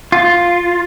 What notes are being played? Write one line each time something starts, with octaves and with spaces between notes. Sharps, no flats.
F4